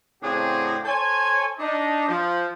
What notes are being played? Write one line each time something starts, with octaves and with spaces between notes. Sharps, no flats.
A2 C#3 C4 D4 F#4 G#4
A4 C5 C#5 G#5
D4 D#4
F3